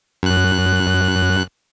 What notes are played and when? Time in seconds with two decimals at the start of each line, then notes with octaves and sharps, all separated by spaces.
0.23 F#2 F#6